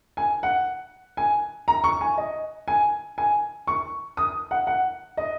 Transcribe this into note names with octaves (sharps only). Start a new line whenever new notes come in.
G#5
F#5
G#5
A#5
C#6
G#5
D#5
G#5
G#5
C#6
D#6
F#5
F#5
D#5